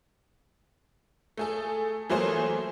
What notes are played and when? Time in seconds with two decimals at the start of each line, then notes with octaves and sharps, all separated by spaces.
1.38 A3 G#4 A4
2.09 E3 F#3 A3 A#3 G#4 C5